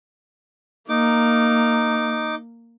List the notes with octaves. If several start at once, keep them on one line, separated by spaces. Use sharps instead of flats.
A#3 D#4 D6